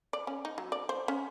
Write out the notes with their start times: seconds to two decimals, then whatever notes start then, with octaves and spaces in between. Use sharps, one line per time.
0.13 D5
0.27 C#4
0.45 D#4
0.58 F#3
0.72 D5
0.89 C5
1.08 C#4